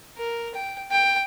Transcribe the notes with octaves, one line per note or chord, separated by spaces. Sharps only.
A#4
G5
G5